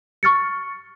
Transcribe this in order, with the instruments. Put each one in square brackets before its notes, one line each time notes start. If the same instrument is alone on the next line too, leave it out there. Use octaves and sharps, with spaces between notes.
[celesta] C#6 F6 A6 C#7